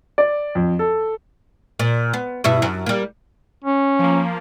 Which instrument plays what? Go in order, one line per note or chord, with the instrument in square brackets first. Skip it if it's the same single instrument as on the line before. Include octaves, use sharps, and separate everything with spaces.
[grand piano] D5
F2
A4
[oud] A#2
B3
G2 B2 E4
F#2
G3 A#3
[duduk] C#4
[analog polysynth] F3 A#3